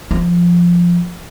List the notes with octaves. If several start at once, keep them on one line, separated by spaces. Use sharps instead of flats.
F3